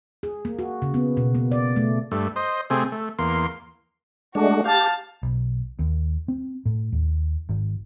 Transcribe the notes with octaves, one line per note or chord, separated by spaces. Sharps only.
G#4
A#3
F#4
C#3
B3
B2
A#3
D5
A3
G2 A3
C5 D#5
C3 A3 C4 G#4
A3
E2 A#3 C6
G#3 A3 D4 F#4
G4 F5 A5
B1
D#2
C4
A2
D#2
G#1